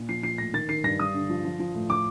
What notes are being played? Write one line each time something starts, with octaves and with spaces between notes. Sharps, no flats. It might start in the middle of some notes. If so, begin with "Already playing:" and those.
Already playing: A#2
F3 C7
F3 C7
A2 A#6
D#3 A6
D#3 C7
G2 A#6
G2 D#6
D3
F3
F3
F3
A2
F3 D6